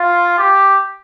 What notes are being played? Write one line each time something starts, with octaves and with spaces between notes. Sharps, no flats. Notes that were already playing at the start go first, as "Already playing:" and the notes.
Already playing: F4
G4